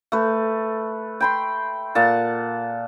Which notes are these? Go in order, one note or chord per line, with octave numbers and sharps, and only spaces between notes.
A3 B4
G5 B5 C6
A#2 F#5 A5